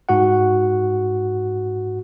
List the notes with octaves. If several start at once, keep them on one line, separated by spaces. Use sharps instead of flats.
G#2 F#4 F#5